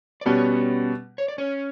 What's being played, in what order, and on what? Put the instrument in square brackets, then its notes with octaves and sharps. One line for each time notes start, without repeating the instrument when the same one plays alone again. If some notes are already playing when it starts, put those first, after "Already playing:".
[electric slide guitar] D5
[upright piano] B2 G3 B3 [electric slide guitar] C#4 C#5
[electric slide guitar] C#5
D5
C#4 C#5